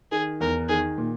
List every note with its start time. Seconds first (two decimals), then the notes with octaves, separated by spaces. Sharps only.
0.12 D#3 G#4
0.40 E2 A#4
0.69 D#3 G#4
0.98 A#2